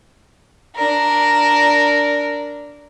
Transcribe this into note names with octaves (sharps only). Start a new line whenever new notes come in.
D4 A#4